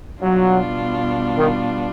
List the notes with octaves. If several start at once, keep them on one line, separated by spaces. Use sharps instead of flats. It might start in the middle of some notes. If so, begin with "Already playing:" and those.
B2 F#3 G3 B3 D4 F4
D#3